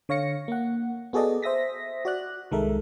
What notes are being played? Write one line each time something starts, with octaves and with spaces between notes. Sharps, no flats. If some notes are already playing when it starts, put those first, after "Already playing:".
D3 C#5 F5 A#6 C#7
A#3 F#5
B3 F#4 G#4 A4 D5 D#5
C5 E5 D#6 A#6 B6
F#4 D5 F#6
C2 D#3 G#3 A4 A#4 E5